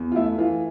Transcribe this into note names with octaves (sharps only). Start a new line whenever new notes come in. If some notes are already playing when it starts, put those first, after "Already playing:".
Already playing: E2
F4
A3 E4
E3 F4